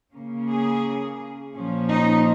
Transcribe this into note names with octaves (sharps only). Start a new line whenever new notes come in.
C#3 A#3 C#4
G#4
A#2 F3 C#4
D#4